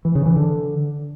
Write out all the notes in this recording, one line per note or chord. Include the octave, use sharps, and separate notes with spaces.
E3
C#3
E3
D3